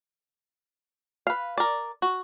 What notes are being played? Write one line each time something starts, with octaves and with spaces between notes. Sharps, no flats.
B4 F5
A#4 D5
F#4